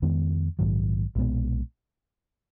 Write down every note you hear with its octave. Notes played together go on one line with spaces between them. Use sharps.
F2 D#3 G#3 B3
A#1 G#2 D#3 F#3
B1 A#2 G#3 B3